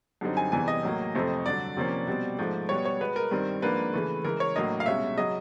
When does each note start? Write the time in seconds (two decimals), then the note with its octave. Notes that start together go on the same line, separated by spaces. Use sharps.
0.21 F#2 D3 G3 C4 D#4
0.37 G#5
0.52 E2 C3 E3 G3 G#5
0.68 D#5
0.83 A2 F#3 A#3
1.15 F2 C3 F3 A3 C4
1.46 G2 D3 F#3 D5
1.77 C3 F3 A#3 C#4
2.07 B2 G3 C4
2.39 G#2 F3 A3
2.69 B2 G3 B3 C#5
2.85 C#5
3.00 B2 G#3 B3 B4
3.16 A#4
3.31 G2 D#3 G3 C4
3.62 G#2 F3 A#3 D4 B4
3.93 C#3 E3 A3
4.25 C#3 E3 G#3 A#4
4.40 C#5
4.55 A2 F#3 A#3 D4 D#5
4.80 F5
4.86 C2 B2 G#3 C#4 E5
5.17 C#3 F#3 D#5